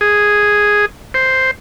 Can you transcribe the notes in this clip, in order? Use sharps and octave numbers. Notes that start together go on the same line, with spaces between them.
G#4
C5